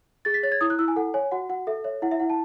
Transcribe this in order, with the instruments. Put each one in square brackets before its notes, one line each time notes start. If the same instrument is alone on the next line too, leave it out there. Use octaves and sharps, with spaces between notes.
[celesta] G#4 A6
B6
C#5 A6
G#6
E4 D#6
F#6
E4 E6
G#5
A4 F#5
C#5 G#5
F#4 F#5
F#4 F#5
A4 E5
C#5 E5
E4 F#5
E5
E4 F#5
A5